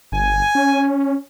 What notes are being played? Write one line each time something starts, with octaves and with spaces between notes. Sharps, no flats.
G1 G#5
C#4